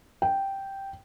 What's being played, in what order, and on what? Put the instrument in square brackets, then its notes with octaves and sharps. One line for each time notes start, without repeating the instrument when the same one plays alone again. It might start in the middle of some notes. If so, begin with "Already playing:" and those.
[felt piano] G5